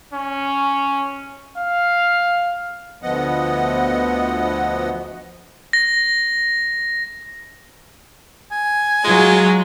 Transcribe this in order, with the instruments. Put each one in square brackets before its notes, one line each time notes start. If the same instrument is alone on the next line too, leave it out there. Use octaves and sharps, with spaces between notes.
[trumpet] C#4
F5
[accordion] D2 F3 B3 D#5 F#5
[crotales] A#6
[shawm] G#5
[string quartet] F#3 F4 [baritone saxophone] G#3